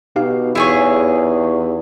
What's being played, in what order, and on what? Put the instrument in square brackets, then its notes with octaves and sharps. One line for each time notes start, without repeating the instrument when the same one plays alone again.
[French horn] B2 [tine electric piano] D#4 G4 F5
[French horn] E2 [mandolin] E4 G#4 C#5